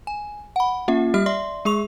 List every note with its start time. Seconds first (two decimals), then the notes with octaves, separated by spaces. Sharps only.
0.07 G#5
0.56 F#5 B5
0.88 A#3 C#4 F4 E5
1.14 G3 G4 E5 F6
1.26 D5 E5 C6
1.65 G#3 G#4 C#6 F7